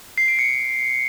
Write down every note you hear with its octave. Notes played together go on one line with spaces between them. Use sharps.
C7
D7
C#7